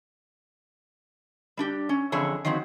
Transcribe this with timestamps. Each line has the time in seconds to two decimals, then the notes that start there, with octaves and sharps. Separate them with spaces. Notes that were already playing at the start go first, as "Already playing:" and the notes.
1.57 G3 D4 G4
1.89 C#4
2.12 F2 D3 E3 G#4 C#5 A5
2.45 D#3 F3 F#3 C4